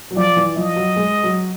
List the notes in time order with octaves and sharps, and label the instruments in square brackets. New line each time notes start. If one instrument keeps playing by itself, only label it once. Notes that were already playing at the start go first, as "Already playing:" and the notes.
[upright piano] F#3
[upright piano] F3 [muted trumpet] D5
[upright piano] E3
[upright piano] F3 [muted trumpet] D#5
[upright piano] F#3
G#3
F#3